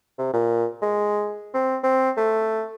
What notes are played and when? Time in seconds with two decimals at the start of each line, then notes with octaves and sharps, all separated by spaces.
0.18 C3
0.33 A#2
0.82 G#3
1.54 C4
1.83 C4
2.17 A3